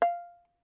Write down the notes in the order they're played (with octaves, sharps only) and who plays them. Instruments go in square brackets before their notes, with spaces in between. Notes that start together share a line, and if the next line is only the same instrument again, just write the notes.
[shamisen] F5